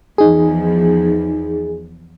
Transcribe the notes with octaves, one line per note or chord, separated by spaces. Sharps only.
E2 E3 F3 D#4 G#4